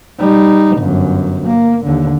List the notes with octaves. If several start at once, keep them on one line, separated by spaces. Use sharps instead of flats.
G3 D#4
G1 F#2
A#3
D#2 D3